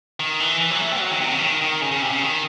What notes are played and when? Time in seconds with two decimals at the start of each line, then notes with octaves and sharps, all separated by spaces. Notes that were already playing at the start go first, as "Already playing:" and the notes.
0.20 D#3
0.40 E3
0.61 E3
0.71 F#3
0.81 A3
0.91 C4
1.00 F#3
1.11 D#3
1.21 C3
1.31 C#3
1.40 D#3
1.61 D#3
1.81 C#3
1.91 C#3
2.02 C3
2.11 C#3
2.22 D#3